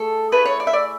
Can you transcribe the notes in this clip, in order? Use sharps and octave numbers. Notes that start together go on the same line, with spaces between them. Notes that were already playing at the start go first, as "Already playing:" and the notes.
Already playing: A3 G#4 A4
A3 E4 G#4 B4
C#5
D5
E5
D5